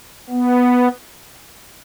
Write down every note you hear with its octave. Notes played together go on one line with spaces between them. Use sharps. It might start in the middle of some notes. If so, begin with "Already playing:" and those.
B3